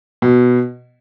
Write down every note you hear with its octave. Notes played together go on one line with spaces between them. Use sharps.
B2